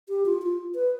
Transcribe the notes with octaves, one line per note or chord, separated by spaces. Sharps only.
G4
F4
F4
B4